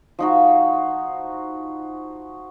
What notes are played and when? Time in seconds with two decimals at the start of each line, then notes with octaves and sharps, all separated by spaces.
0.19 F3 D#4 F#4